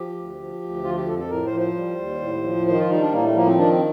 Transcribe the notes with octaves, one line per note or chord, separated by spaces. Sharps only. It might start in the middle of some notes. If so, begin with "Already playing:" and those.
Already playing: F3 G4
D2
F3
D2
F3 F4
G4
F2 A4
A4
A2 A#4
C5
F3
C5
G3
D#2
A2
F3
D#3 C5
F4
G3 D#4
D4
A2 A#3
A3
F3 A#3
C4
D#3 D4
C4